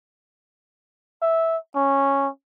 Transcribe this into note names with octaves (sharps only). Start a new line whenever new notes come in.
E5
C#4